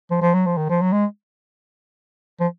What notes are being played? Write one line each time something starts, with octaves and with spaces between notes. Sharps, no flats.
F3
F3
F#3
F3
D#3
F3
F#3
G#3
F3